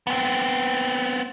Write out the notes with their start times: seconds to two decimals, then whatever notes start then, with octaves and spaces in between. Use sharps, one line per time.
0.07 B3 C4